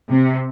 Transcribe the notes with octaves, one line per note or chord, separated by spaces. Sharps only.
C3